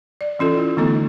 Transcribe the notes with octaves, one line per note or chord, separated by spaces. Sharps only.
D5
E3 C#4 F4 A4
E4 F4
D3 E3 A3 B3 D#4 A4